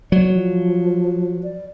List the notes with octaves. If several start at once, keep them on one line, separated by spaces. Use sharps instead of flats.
F#3 D5
F3
D5